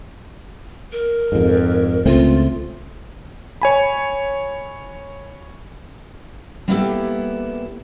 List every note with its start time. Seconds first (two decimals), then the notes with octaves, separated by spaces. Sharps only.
0.92 A#4
1.32 F2 G#2
2.06 C#2 A3 C4 F4
3.62 C#5 G#5 B5
6.68 G3 A#3 B3 E4 G4 A4